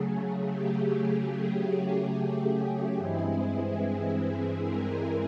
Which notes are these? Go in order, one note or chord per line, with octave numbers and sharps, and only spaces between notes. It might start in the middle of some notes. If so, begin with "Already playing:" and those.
Already playing: C#3 F#3 A3 G#4
G4
G#4
G#4
G2 E3 G#3 C4 E4 G#4
G#4
A#4